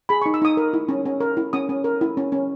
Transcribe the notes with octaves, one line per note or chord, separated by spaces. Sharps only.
G#4 B5
C#6
D#4
E6
D#4 D#6
A#4
E4
C#4
C#4
A#4
E4
C#4 D#6
C#4
A#4
E4
C#4
C#4